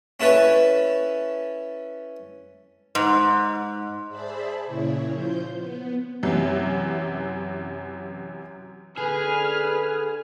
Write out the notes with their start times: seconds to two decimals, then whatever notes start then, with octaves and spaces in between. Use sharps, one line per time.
0.20 C#4 E4 A4 B4 C#5 G#5
2.95 G#2
4.09 G#4 C5 D5 E5 A5 B5
4.66 A#2 C#3 E4 C#5
5.12 F3 C5 G6
5.55 B3
6.23 F#2 C3 E3
8.97 D3 G#4 B4 F6